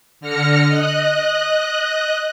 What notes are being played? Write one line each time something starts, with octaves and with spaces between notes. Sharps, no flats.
D3 F6 A#6 C#7
D#5 F#6